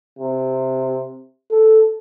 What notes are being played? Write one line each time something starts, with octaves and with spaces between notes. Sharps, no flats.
C3
A4